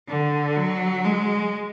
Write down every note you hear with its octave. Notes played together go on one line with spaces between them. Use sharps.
D3
F#3
G#3